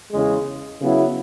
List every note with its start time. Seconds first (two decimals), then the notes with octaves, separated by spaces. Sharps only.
0.12 E2 C#3 G#3
0.81 C#3 F#3 B3 E4